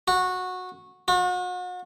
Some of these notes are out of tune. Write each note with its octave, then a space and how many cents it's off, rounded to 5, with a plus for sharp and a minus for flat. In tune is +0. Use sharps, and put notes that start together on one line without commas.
F#4 -15
F#4 -40